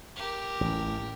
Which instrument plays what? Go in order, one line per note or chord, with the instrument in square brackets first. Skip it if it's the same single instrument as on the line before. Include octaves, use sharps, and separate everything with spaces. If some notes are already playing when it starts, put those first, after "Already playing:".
[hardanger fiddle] G4 A#4
[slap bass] A1